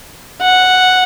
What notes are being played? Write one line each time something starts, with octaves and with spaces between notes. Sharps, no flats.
F#5